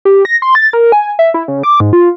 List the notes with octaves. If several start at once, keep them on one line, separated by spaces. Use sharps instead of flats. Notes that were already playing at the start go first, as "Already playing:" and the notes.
G4
A#6
C6
A6
A#4
G#5
E5
E4
C#3
D6
G#2
F4